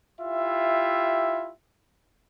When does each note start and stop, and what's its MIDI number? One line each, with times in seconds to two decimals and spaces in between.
0.20 1.51 64
0.20 1.51 65
0.20 1.51 67
0.20 1.51 76